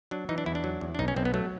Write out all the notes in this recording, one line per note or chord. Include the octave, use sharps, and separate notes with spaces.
F#3 D4
E3 D#4
D4
E2 E4
D4
F#3
E2
D4
B1 D#4
C#4
B1 C4
B3
F#3 A3